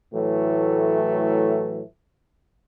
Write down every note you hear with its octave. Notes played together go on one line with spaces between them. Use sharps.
A2 E3 F#3 A3